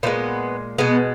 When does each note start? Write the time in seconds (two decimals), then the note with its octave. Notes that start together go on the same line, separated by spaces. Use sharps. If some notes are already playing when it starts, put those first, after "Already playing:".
0.03 A#2 F3 B3
0.07 G#3
0.78 B2 G#3 B3